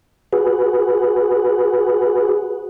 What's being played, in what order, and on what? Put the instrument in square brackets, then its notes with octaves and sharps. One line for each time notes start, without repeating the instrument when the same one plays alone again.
[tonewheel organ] F#4 G#4 B4